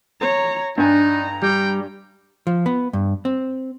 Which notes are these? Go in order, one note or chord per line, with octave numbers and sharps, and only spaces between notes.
C#5 A#5
G2 D4 D#4 G#5 A#5
G3 G5
F3
B3
G2
C4